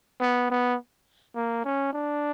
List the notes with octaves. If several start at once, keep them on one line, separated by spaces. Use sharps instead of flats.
B3
B3
A#3
C#4
D4